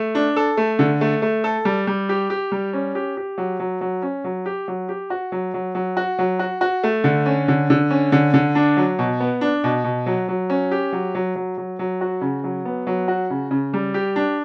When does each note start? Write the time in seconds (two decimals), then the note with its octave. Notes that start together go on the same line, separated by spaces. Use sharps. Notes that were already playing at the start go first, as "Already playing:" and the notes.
Already playing: A3
0.15 D4
0.36 A4
0.57 A3
0.79 D3
1.01 A3
1.22 A3
1.44 A4
1.65 G3
1.87 G3
2.09 G4
2.30 G4
2.52 G3
2.73 C#4
2.95 G4
3.17 G4
3.38 F#3
3.60 F#3
3.81 F#3
4.02 C#4
4.24 F#3
4.46 G4
4.68 F#3
4.89 G4
5.10 F#4
5.32 F#3
5.54 F#3
5.75 F#3
5.97 F#4
6.19 F#3
6.39 F#4
6.61 F#4
6.83 A3
7.04 D3
7.26 C#4
7.48 D3
7.70 D3
7.90 C#4
8.12 D3
8.34 D3
8.55 D4
8.77 F#3
8.99 B2
9.20 B3
9.41 D4
9.64 B2
9.84 B2
10.06 F#3
10.28 F#3
10.50 C#4
10.71 G4
10.92 F#3
11.15 F#3
11.36 F#3
11.58 F#3
11.79 F#3
12.01 F#4
12.21 C#3
12.44 F#3
12.65 B3
12.87 F#3
13.08 F#4
13.30 C#3
13.51 C#3
13.73 G3
13.94 G4
14.16 D4